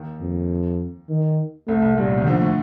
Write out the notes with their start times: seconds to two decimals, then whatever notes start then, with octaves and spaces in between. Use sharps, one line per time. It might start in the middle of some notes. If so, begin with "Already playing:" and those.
Already playing: D#2 D#3
0.21 F2
1.09 D#3
1.68 C2 C3 A3
1.82 C2 C3
1.97 A#1 A#2 G3
2.07 A1 A2
2.17 C2 C3
2.22 D#3
2.27 D2 D3 F3
2.41 A2 A3